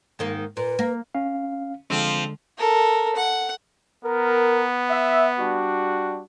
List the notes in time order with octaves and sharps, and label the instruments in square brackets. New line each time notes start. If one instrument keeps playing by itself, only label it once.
[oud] G#2 D#3 A#3
[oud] A#2 [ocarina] B4
[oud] A#3
[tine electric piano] C#4 F5
[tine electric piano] D3 G#3 [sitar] F3 C4
[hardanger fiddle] A4 A#4
F#5
[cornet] B3 [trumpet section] A#4
[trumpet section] E5
G3 D4 F#4